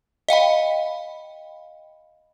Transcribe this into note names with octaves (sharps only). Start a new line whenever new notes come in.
D#5 F5 G5 B5